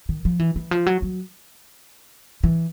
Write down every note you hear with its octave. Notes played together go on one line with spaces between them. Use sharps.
D#3
F3
E3
E3
F3
F#3
F#3
E3